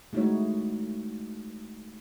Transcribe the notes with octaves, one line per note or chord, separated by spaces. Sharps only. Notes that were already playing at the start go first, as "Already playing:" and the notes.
G#3 A3 D#4 E4 F#4 C#5